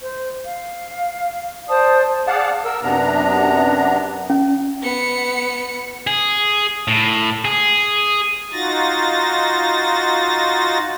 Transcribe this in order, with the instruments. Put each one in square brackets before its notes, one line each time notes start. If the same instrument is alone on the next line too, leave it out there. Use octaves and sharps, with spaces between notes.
[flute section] C5
F5
C5 D5 A5 D#6
[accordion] G#4 D5 F5 F#5 A5
A#4 E6
F#2 C3 B3 D4 A#5
[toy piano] C#4
[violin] B3 C#7
[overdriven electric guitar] G#4
A2
G#4
[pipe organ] D#4 F4 F#4 A6 A#6